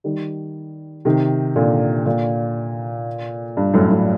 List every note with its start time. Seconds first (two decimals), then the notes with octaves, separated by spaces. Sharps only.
0.04 D#3 G3
1.05 C3 D#3
1.56 A#2 D3
2.06 A#2 D3
3.57 G2
3.74 F#2 A2
3.91 F#2 A2